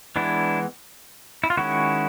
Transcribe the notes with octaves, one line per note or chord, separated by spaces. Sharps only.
E3 G#3 B3 D4 E4
E4
F4
D#3 G#3 C#4 E4 F#4